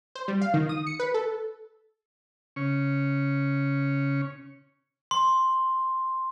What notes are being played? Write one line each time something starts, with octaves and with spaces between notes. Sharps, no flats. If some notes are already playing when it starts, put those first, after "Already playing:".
C5
G3
F5
D#3
D#6
C#7
B4
A4
C#3 C#4 C#6
C6